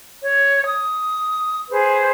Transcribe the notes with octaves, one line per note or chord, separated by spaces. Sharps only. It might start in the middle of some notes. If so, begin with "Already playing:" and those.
C#5
D#6
G#4 B4 C5